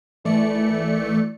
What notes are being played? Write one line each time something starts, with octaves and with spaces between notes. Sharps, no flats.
G#1 E3 A3 D5 C#7